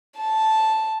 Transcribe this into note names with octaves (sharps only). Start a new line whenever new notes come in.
A5